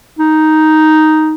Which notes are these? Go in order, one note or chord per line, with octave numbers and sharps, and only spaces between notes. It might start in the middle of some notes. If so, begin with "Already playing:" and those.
D#4